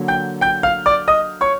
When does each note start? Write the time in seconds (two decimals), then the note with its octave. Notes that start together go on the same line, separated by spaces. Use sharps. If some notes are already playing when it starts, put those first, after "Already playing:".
Already playing: D3 F#3 A#3
0.08 G5 G6
0.41 G5 G6
0.63 F5 F6
0.86 D5 D6
1.08 D#5 D#6
1.41 C#5 C#6